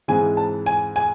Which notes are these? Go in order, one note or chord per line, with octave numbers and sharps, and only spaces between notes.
G#2 E3 G#3 C4 G#5
A5
G#5
G#5